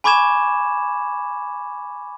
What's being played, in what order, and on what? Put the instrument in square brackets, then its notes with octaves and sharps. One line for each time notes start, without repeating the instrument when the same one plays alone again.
[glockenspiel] G#5 B5 C#6 D6 G#6 E7